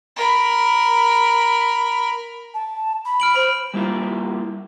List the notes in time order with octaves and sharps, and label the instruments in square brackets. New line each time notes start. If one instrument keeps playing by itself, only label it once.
[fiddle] A#4 B5
[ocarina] A5
B5
[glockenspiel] F6 D7 F#7
[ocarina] C5 [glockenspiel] B5
[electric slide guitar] G3 A#3 E4 F4